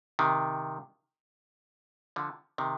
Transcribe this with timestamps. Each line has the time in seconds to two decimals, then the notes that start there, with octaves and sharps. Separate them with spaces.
0.19 C3 D#3
2.16 D3 F3
2.58 C3 D#3